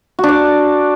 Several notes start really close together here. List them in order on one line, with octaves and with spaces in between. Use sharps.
F#4 D4 D5